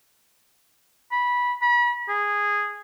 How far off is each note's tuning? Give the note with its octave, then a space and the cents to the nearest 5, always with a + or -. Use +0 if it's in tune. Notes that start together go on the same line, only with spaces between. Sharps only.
B5 -15
B5 -40
G#4 -10